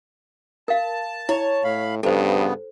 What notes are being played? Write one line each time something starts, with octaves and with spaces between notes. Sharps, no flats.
A#4 F5 A5
E4 C#5
A2 F5 B5
G2 C#3 F3 B3 A4 C5